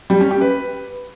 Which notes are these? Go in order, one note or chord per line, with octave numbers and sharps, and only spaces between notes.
G3
C#4
G4
B4